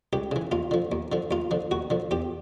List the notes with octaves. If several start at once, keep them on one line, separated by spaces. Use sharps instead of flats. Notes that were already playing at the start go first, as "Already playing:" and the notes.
C#2 G4
C#3 E3
D#2 F4
D3 F3
D#2
D3 F3
D#2 F4
D3 F3
D#2 F#4
D3 F3
E2 G4